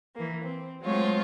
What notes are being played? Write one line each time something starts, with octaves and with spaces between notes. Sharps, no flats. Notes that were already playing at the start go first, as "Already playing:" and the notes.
E3 A#3
C4
F#3 G#3 A3 C4 F4 C#5